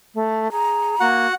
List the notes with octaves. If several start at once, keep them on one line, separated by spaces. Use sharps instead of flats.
A3
G#4 A#5
A#3 F#4 F#5